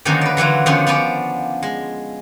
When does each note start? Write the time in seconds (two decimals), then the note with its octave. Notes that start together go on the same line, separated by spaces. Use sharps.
0.05 D3 D#3 F3 F#3 A#3 C#4
0.21 B4 D5
0.37 D3 E3 F#3 F4
0.66 D3 D#3 F3 B3 C#4 D4
0.87 F3 B3 C#4 D4 D5
1.63 G#3